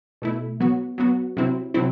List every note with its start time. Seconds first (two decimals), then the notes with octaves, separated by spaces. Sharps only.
0.22 B2 A3 E4
0.60 F#3 B3 F#4
0.98 F#3 B3 F#4
1.37 C3 F#3 C4 E4
1.74 C3 F#3 C4 E4